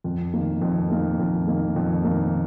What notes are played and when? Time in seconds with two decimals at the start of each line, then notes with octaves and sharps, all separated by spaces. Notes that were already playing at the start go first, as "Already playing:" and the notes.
0.04 F2
0.33 D#3 A#3
0.61 F2
0.90 D#3 A#3
1.19 F2
1.47 D#3 A#3
1.76 F2
2.04 D#3 A#3